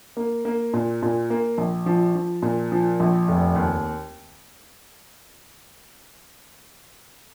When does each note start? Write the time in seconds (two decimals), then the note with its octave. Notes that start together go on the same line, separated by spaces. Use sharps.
0.17 A#3
0.45 A#3
0.73 A#2
1.02 A#2
1.30 A#3
1.58 A#1
1.86 F3
2.15 F3
2.42 A#2
2.72 F3
3.00 A#1
3.28 F1
3.56 D#2